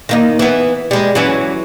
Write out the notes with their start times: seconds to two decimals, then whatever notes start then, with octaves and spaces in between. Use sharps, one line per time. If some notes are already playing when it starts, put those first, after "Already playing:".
0.09 D#3 A#3 D#4
0.39 E3 B3
0.91 G3 G#3
1.15 E3 F#3 C#4